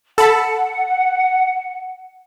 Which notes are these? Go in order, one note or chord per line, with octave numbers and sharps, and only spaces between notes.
A4 F#5 A5 B5